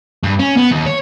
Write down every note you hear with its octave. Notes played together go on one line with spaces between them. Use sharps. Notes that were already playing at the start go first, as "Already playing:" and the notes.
G2
C#4
B3
D#2
C#5